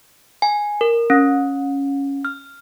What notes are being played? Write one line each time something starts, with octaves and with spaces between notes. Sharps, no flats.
G#5
A#4
C#4
F6